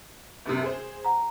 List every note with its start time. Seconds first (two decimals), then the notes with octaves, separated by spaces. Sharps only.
0.46 G1 F#2 C3
0.63 G#4 C5
1.05 F#5 A#5